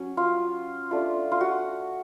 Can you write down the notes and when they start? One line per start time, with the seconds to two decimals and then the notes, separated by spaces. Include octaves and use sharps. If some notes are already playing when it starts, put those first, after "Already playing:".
Already playing: F#3 C#4
0.17 F4
0.91 A3 D4 F4
1.32 F4
1.41 F#4